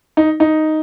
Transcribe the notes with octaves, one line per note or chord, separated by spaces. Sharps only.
D#4
D#4